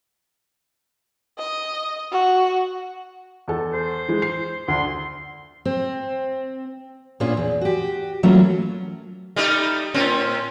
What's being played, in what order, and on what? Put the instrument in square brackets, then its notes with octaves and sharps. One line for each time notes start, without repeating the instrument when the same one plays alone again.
[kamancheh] D#5
F#4
[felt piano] E2 A4
[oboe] C5
[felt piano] E3 G#3
C7
[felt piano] D2 D4 [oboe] C6
[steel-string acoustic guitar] C4
A#2 B3 C#4 D4 F4
E2
F#4 G4
E3 F#3 A3 A#3 C#4 F4
[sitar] G3 A3 D#4
A2 C4 C#4